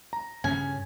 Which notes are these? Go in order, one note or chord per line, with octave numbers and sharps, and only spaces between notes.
A#5
G2 C#3 C#4 G#5